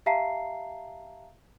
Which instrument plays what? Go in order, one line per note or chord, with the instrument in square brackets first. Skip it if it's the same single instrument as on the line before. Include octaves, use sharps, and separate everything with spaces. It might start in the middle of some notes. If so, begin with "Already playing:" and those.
[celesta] G4 E5 F5 A5 A#5 C7